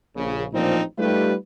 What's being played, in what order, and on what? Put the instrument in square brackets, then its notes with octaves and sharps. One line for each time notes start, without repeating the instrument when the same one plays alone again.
[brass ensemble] A#1 C#3
A1 A#2 F3 C4 D4 D#4
G3 A3 D#4 F4 G4 B4